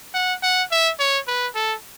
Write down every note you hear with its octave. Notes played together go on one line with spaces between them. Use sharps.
F#5
F#5
E5
C#5
B4
A4